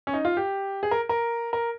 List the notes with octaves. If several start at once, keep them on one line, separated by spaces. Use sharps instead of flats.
C#4
D#4
F4
G4
G#4
A#4
A#4
A#4